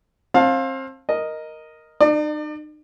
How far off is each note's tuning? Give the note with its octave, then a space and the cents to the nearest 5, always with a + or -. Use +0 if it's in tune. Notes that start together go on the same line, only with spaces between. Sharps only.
C4 +30 F5 +15 A5 +0
A#4 +0 D#5 +0
D#4 -40 D5 +35